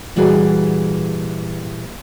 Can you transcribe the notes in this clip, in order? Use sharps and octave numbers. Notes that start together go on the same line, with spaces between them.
A#2 E3 G3 F#4 G#4